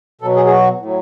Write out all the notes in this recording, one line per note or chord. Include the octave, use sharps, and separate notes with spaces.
B2 F#3 A4
G#4
G#4
F#4
A2 F#3